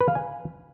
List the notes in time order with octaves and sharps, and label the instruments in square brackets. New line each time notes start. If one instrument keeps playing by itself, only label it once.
[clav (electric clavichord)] B4
F5
G#5